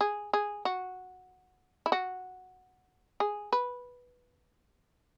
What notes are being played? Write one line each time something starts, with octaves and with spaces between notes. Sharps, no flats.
G#4
G#4
F#4
E4
F#4
G#4
B4